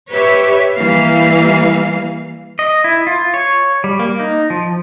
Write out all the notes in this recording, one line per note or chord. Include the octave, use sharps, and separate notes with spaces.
G4 B4 C#5 E5
E3 G3 A#3 F5
D#5
E4
F4
C#5
G3
A#3
D#4
F3